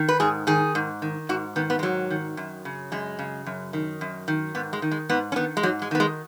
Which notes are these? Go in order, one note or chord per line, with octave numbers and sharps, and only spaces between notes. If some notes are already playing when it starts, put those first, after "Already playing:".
Already playing: D#3
B4
G#2 G#4
D#3 G#4
G#2
D#3
G#2 F#4
D#3 B3
B3
G#3
G#2 F#3
D#3
F#2
C#3
F#2 G#3
C#3
F#2
D#3
F#2
D#3
G#2 B3
G#3
D#3
G#3
G#2 B3
C#4
D#3 B3
G#3
G#2 F#3
G#3
D#3 B3
G#3